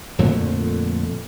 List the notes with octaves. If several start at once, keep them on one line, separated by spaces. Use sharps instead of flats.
F2 A#2 D3 A3